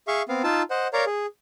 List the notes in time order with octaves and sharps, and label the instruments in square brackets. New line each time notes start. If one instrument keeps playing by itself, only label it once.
[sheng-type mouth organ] G#4 E5 F5 C#6
B3 C4 F5
D#4 F4 A5 E6
C5 D#5 F#5
A#4 C#5 D5 F5 A#5
G#4